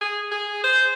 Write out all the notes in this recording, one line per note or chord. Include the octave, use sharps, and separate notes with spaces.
G#4
G#4
C5